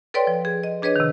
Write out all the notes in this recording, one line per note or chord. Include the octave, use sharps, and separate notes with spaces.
A4 B4 C#5 D5 G5 C6
F3
G#4
D#5
D4 G#4 B4 C#5 D#5
C3 D#3